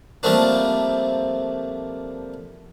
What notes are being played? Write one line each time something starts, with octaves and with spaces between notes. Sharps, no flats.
F3 G3 A3 A#3 C4 D4